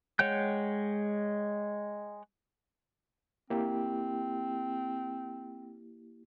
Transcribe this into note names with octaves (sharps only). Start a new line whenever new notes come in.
G#3 C#5 F#5 G5 G6
A#3 C4 E4 G4